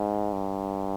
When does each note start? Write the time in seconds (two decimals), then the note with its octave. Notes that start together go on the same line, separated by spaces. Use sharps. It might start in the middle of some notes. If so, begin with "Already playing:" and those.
Already playing: G#2
0.33 G2